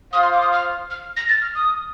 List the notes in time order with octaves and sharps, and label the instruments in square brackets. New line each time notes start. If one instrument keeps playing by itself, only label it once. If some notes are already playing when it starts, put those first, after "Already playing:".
[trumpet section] F4 C5 F5 [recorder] D#6
[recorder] C6
D6
D#6
F6
F6
A#6
A6
F6
D#6